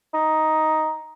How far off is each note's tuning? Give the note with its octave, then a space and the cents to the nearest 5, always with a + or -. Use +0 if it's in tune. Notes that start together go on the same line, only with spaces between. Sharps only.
D#4 +5